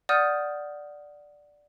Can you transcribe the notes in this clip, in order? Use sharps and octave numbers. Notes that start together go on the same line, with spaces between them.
D5 F#5 D#6 F6 G6 D#7